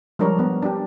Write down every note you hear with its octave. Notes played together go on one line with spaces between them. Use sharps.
F3 G3 G#3 D4 A#4 C#5
B3
D4 G4